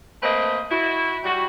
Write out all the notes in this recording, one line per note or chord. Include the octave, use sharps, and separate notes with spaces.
A3 A#3 C4 B4 C5 D#5
E4 F#4
G3 F#4